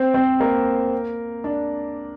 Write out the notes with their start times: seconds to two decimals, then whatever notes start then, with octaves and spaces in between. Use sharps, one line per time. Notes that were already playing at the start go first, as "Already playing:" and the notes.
Already playing: C4 C5
0.14 C4 C5
0.40 A#3 A#4
1.44 D4